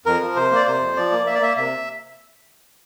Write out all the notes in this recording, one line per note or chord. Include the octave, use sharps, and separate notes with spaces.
F2 A#4
F3
C3 C5
A#3 D5
C3 C5
F2
F3 D5
A#3
A#3 E5
D5
A#3 E5
C3 E5